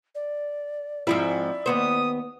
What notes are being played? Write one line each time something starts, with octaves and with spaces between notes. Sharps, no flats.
D5
G#2 F3 C4 E4 D5
D#2 B3 C5 D#6